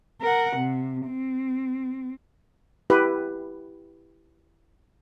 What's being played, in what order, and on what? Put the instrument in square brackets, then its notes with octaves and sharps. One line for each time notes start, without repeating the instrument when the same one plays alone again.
[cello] A#4 F#5
C3
C4
[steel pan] E4 G4 B4